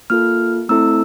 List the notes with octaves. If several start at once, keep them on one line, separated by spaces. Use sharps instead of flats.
A#3 F4 A4 F6
A3 C4 E4 A4 E6